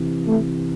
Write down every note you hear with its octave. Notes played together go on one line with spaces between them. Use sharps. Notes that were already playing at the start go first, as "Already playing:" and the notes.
Already playing: C3 E3
A3